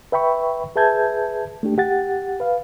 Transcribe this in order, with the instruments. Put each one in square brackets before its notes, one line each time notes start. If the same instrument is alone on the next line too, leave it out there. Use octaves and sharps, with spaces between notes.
[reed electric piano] B4 E5 G5 B5 C#6
G#4 B4 E5 A5 G6 G#6
A3 D4 G4
G4 F#5 A6
B4 F5